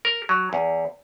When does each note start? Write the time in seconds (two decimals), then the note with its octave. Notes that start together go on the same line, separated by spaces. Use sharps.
0.05 A#4
0.29 F#3
0.53 E2